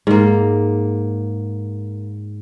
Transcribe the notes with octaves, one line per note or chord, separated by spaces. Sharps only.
G#2 A#3